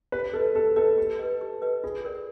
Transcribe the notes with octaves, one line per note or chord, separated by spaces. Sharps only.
G4 B4
A4 B4 D#5
G4 A4
A4 B4 D#5
G4
B4 D#5
G4
B4 D#5
F4 G#4
A#4 D5